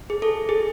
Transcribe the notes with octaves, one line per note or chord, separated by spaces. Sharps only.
G#4
A4
G#4